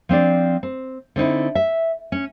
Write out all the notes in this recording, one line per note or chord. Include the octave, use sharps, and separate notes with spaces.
F3 C4 D4 D5
C4
D3 C4 D#4 E4
E5
C#4